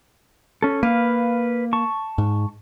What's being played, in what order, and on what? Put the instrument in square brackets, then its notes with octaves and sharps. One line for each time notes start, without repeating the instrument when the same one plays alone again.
[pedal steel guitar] C#4 A4
[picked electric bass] A#3 [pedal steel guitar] B4 F5
[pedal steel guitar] A5 C#6
[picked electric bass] G#2